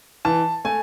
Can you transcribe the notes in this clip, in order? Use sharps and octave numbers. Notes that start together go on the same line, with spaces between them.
E3 A5
A3 G#5